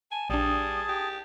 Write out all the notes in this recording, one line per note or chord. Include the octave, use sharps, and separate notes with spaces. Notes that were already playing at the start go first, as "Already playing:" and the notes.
G#5 A5
A#1 G3 D4 G#4 A5 D#6
G4